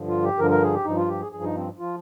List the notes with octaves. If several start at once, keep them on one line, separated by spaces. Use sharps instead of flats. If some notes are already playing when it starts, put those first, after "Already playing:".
Already playing: G2 D3 F3
F4
G4
G2 D3 F3 A#4
A#4
G#4
G4
G2 F3 D#4
F4
G4
G#4
G2 F3 G#4
D#4
C4
F3 F4